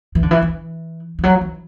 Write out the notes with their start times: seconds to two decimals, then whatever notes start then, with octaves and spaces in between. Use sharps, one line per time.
0.15 E3
0.23 D3
0.31 E3
0.42 E3
1.19 E3
1.23 F#3
1.41 E3